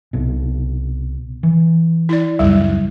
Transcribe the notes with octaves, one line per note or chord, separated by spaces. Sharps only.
C2 B2
E3
E4 D5
C#2 F#2 G3